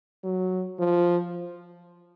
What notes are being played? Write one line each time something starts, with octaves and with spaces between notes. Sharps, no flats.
F#3
F3